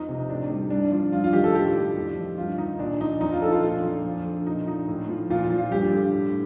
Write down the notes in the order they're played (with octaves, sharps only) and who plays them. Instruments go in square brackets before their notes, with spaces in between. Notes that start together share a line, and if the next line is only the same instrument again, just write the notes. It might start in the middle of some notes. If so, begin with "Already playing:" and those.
Already playing: [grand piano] F2 F3 D#4
C3
A2 D4
G3
G2 D4
F3
G2 F4
F4
D#3 G4
A4
A2 G4
G3
F2
D#3
G2 F4
D#3 D#4
A#2 D4
F3 D#4
F2 D#4
F4
D3 A4
F4
A#2 F4
F3
F2
D3
A#2 D#4
F3 D#4
A2
F3
A#2 F4
F4
F3
F4
G2 G4
D3
A2